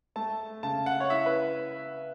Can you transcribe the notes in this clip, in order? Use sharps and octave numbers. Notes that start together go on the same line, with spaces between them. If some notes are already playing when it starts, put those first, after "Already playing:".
A3 A5
C#3 A5
F#5
C#5
E4 E5
B4